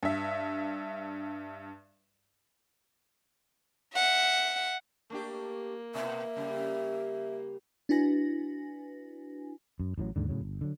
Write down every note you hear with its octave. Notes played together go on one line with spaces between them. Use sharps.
G2 E5
E5 F#5
A3 A#3 D4 G4
B2 B3 E5
C#3 G3
D4 E4 F#4 B4 G#5 A#6
F#2
A1 A2 D#3 F#3
D#2 G#2 D3
A2 C#3 F#3
G1
D3 F#3